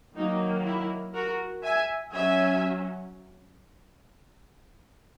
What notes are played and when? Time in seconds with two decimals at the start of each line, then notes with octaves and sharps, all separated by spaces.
0.15 D#3 F#3 A#3 D#4
0.65 E4
1.14 F#4 A#4
1.63 E5 G#5
2.13 F#3 C#4 E5 G#5